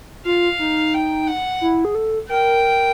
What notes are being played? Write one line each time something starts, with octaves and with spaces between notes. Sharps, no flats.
F4 F5
D#4
G5
F#5
E4
G#4
A4
A#4 G5